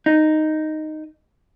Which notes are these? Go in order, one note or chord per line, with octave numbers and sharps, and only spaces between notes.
D#4